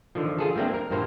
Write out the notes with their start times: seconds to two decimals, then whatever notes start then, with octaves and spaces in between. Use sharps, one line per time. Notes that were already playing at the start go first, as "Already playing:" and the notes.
0.15 D3 D#3 F3
0.38 F4 G#4 A4
0.56 G3 A3 A#3 C4 D4
0.74 A#4
0.91 G2 A#2 A#3 C5 A#5